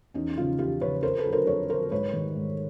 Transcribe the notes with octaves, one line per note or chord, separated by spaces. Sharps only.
E2 C#4 D#4
C#3 F3 D#4 F4
E2 F4 G4
C#3 F3 B4 C#5
F2 A#4 C5
A4 B4
D3 F#3
A#4 C5
F2 B4 C#5
D3 F#3 A#4 C5
G#2 B4 C#5
D#3 G3
G#2